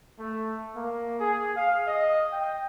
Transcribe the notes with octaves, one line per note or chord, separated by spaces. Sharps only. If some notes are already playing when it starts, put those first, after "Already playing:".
A3
A#3
G#4
F5
D#5
G5